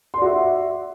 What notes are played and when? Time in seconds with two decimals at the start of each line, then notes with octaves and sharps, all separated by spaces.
0.14 C6
0.18 D5
0.22 F#4
0.26 E5